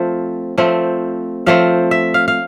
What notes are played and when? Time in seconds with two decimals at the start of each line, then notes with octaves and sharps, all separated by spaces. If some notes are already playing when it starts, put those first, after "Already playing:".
Already playing: F3 A3 C4
0.58 F3 A3 C4
1.46 F3 A3 C4 F5
1.91 E5
2.14 F5
2.28 F5